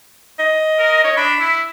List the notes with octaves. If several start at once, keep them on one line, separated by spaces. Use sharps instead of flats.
D#5
A#4
C#5 D#5
D4 B5
E4